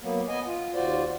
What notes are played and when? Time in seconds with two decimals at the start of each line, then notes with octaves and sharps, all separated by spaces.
0.01 F#3 A#3 B3
0.29 B3 D#5 G#5
0.46 F4
0.74 D#2 F4 F#4 C5 D5